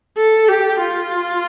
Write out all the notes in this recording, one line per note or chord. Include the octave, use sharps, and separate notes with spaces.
A4
G4
F4